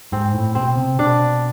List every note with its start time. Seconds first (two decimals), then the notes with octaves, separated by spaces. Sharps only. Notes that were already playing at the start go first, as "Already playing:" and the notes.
0.12 G#2 C4
0.34 A2
0.55 B2 C4
0.77 C3
0.99 B2 D4